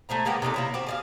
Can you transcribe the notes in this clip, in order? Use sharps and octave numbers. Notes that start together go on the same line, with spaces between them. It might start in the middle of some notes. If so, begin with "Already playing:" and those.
A3 E4 C5 A#5
G#3 A#3 B3 G4
C3 D#4 G#4 A4
A#3 E4 C#5
C4 F#4 G4
G#4 D5 F5